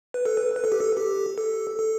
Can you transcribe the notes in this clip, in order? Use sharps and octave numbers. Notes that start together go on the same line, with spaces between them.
B4
A4
B4
B4
A4
G4
A4
G4
A4
A4